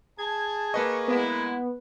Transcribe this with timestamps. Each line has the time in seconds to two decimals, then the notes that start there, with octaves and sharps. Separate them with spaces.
0.18 G#4 A5 G#6
0.74 A#3 B4 D#5 C#6
1.08 G#3 B3 E4